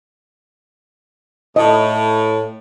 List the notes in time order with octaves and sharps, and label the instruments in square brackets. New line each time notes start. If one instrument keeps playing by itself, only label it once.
[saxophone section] A2 [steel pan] D#5